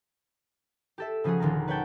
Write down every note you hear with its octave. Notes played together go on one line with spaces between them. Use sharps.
G4 A4 E5
C#3 F3 C#4 F#4 G#4
D#1 D#2 D3 F5 A#5
B4 C#5 F#5 G5 A5